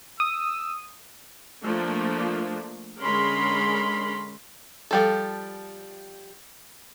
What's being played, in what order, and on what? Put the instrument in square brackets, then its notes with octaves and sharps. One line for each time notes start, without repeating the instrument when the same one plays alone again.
[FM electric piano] D#6 [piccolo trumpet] E6
[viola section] F3 A3 A#3 D4
D3 G#3 C#4 A#4 B5 C6
[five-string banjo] F3 G3 A4